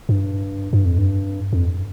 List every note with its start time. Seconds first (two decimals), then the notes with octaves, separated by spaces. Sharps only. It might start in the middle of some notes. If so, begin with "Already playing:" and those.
0.09 G2
0.73 G2
0.85 F2
0.98 G2
1.53 F2